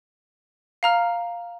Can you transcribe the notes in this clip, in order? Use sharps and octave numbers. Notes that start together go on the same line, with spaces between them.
F5 A#5 F6